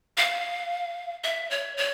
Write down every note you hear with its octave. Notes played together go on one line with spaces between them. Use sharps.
F5
E5
C#5
C#5